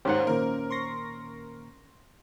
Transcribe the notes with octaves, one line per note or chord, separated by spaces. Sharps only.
D#2 G#2 C#4 G4 C5 F#5
A#2 D#3 A#3 A#4
C6 C#6 A#6